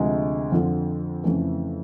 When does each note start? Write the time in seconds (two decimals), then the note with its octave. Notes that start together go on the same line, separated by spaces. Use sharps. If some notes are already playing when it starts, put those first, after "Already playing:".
Already playing: D2 C3 F3 G#3
0.52 F2 D3 F3
1.24 F2 C#3 E3 A3